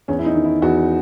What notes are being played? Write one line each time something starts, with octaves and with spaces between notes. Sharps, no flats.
E2 C#4
E4
D#4
D#3
E4
E2 F#4